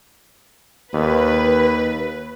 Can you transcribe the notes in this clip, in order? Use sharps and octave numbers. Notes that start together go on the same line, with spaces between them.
D#2 B4